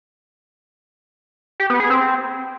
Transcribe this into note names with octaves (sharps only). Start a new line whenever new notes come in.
G4
B3
G#4
C4